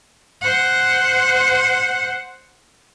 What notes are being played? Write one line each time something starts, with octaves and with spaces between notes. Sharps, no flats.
C5 F#5